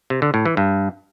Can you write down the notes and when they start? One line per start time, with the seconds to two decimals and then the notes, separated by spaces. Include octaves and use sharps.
0.10 C3
0.22 D3
0.34 A2
0.46 E3
0.57 G2